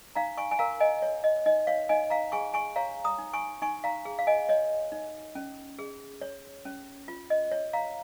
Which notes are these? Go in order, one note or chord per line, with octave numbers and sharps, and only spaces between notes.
D#4 F5 A#5
G#5 C#6
G#5
A#4 F5 A#5
D#5 G#5
C#5
D#5
D#4 D#5
C#5 F5
D#4 D#5 G#5
F5 A#5
G#4 G#5 C#6
G#5 C#6
C#5 F5 A#5
A#5 D#6
D#4
G#5 C#6
D#4 G#5 C#6
F5 A#5
G#4
F5
D#5 G#5
C#5 D#5
D#4
C#4
G#4
C#5
C#4
F4
D#5
C#5
F5 A#5